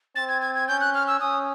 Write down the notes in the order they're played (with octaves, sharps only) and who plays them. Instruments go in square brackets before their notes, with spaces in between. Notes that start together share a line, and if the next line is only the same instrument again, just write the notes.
[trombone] C4 [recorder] A6
[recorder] G#6
G#6
G#6
[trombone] C#4 [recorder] G6
[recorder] F#6
F6
E6
[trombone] C#4 [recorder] D#6